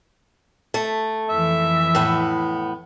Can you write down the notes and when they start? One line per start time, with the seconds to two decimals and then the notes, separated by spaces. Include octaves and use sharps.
0.74 A3
1.29 F2 E3 E5
1.95 A2 B3